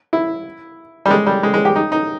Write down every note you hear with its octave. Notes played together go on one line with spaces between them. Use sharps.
E4
G3
G#3
G3
G#3
G#3
G4
D#4
D#4